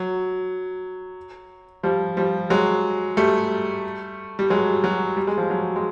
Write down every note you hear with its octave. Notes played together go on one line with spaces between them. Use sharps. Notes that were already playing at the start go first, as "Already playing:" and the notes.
Already playing: F#3
F3 G3
F3 G3
F#3 G#3
G3 A3
G3
F#3 G#3
F#3
G3
G#3
F3 G3
F#3
G#3